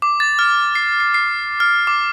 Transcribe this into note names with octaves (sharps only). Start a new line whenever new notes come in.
D6
A6
F6
C7
C7
C7
F6
D6